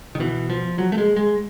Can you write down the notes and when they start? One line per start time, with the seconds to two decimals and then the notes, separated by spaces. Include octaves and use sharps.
0.15 D#3
0.20 B2 E3
0.50 F3
0.78 F#3
0.92 A3
0.98 G#3
1.16 G#3